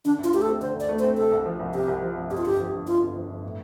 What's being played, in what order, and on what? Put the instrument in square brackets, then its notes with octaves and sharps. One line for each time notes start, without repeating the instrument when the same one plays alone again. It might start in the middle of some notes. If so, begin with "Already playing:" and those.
[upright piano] D3 [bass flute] D4
[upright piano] D2
[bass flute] F4
[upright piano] A3 [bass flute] G4
[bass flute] A4
[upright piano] C4
[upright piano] D3 [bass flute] C5
[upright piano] D2
[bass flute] D5
[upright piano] A3
[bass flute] C5
[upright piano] C4
[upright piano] C3 [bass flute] A4
[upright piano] C2
F3
C2
[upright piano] C3 [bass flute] G4
[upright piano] C2
F3
C2
[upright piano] F2 [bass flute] G4
[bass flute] F4
[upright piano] G1 [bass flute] G4
[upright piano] F3
G1
[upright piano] F2 [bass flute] F4
[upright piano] G1
F3
G1
A2